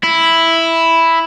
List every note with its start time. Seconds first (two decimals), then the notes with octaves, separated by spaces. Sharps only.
0.04 E4